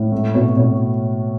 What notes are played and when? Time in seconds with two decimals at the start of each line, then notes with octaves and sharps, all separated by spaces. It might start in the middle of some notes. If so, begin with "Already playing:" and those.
Already playing: A2
0.12 A3
0.35 B2 C#5
0.57 B2 C#5